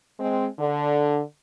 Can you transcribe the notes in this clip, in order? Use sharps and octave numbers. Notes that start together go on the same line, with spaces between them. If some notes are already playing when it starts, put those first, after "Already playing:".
G#3 C4
D3